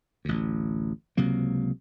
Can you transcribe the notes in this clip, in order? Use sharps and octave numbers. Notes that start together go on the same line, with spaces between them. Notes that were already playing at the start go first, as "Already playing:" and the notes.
A1 D2
C#2 C3 F#3 A#3